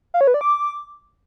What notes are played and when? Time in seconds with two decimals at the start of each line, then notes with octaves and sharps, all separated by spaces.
0.14 F5
0.21 C#5
0.27 B4
0.34 D5
0.41 D6